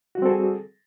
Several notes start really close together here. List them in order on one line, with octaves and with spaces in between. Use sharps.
F#4 G3 C4 A4 G#4